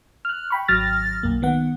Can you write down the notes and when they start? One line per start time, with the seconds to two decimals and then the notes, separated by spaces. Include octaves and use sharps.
0.25 F6 F#6
0.50 G5 B5 C#6
0.68 G#1 F#3 F6 A6 A#6
1.23 B1 F#2 A#3
1.42 D#3 B3 F#5